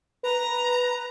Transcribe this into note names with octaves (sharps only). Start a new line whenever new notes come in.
B4 A#5